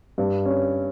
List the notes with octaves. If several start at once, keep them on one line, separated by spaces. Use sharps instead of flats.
G2
C#4